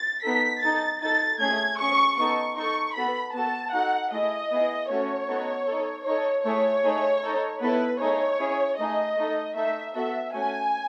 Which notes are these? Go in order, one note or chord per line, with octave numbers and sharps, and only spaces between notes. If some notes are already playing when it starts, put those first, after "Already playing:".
Already playing: A6
B3 D#4 A4 B6
D#4 A4 A6
D#4 A4 A6
A3 C#4 G#4 G#6
C#4 G#4 C#6
B3 D#4 A4 C#6
D#4 A4 C#6
B3 F#4 A4 B5
B3 F#4 A4 A5
D#4 F#4 A4 F#5
A3 E4 G#4 D#5
B3 E4 G#4
A3 C#4 F#4 A4 C#5
B3 D#4 F#4 A4
D#4 A4
D#4 A4 C#5
A3 E4 G#4 C#5
A3 D#4 G#4
D#4 A4
B3 E4 A4 B4
A3 D#4 G#4 C#5
C#4 E4 G#4
A3 D#4 G#4 D#5
A3 D#4 A4
A3 D#4 A4 E5
B3 F#4 A4 E5
A3 C#4 F#4 G#5